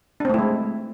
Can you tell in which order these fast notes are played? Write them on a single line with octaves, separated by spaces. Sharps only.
D4 C4 A3 E4 G#3